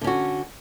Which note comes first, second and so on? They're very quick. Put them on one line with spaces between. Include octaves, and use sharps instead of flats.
D3 C#4 F#4